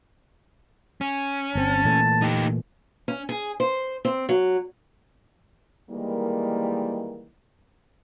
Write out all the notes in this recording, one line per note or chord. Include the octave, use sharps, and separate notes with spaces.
C#4
G1 C4 A5
A#2 E3 A3
D#4 G4
C#4
G#4
C5
C4
F#3
D#3 E3 G3 G#3 A#3